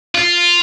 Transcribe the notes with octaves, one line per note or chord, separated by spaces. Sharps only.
F4